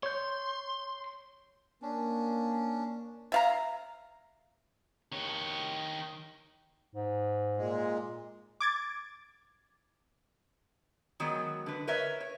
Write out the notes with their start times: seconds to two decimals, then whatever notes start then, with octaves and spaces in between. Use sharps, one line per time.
0.03 C#5 C6 G6
1.82 A#3 C#4 D4
3.32 E5 F5 A#5
5.12 D#3 C#5
6.95 G#2
7.57 A#2 G#3
8.60 D6 G#6 A6
11.20 D#3 F#3 G#3 B3
11.66 D3 B4
11.87 A#4 B4 C#5 D#5 E5
12.20 C#5